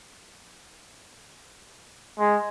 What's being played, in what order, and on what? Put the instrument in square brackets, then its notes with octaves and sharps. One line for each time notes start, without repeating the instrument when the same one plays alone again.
[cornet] G#3